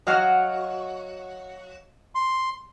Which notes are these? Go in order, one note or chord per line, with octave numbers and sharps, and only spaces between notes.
F#3 F#4 D#5 F5 F6
C6